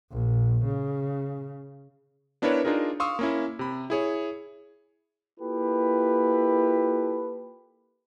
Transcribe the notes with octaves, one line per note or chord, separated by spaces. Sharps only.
A#1
C#3
B3 D4 E4 A#4 B4 C#5
D4 D#4 F4 G#4 A#4
F5 C6 C#6 D#6 E6
A#3 C#4 E4
C3 B5
E4 G#4 C#5
A#3 E4 F4 G4 A4 B4